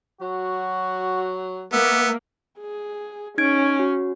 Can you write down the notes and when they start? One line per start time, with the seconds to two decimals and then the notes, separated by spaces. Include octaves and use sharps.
0.21 F#3 F#4
1.72 A#3 B3 E5
2.60 G#4
3.38 C#4 D#4 G#6 D7
3.79 F#4